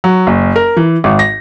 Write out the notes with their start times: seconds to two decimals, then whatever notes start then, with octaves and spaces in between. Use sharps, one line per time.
0.04 F#3
0.27 F#1
0.56 A#4
0.77 E3
1.04 G#1
1.19 A#6